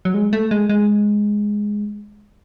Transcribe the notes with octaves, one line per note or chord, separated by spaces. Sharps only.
F#3
G#3
A3
G#3
G#3